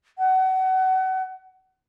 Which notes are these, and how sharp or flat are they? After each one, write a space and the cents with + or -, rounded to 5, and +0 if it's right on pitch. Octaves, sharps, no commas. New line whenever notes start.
F#5 +30